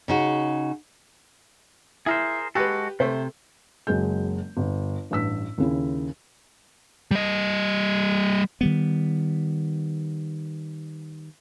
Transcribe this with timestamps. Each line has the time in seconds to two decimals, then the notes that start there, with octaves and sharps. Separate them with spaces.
0.08 C#3 D#4 F#4
2.06 E4 G#4 A#4 C5
2.55 G#3 F#4 G4 A4 B4
3.00 C3 A3 C5
3.87 F#1 F#3 G#3 G6
4.57 G1
5.11 A1 G2 E6 B6
5.58 D#2 C#3 E4
7.11 G3 D#5
8.61 D#3 G3 B3